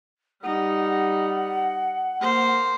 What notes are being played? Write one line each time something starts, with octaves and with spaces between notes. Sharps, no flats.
G3 D#4 F#5
A#3 C5